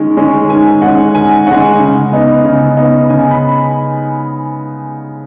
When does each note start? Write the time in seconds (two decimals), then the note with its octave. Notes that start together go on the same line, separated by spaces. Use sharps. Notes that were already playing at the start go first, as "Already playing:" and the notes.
Already playing: D#3 G#3 C#4
0.17 G#3 C#4
0.49 D#3 G#5
0.82 G#3 C#4 F#5
1.14 D#3 G#5
1.47 G#3 C#4 F#5
1.79 C#3
2.12 B3 D#4
2.44 C#3
2.77 B3 D#4
3.09 C#3 G#5
3.31 B5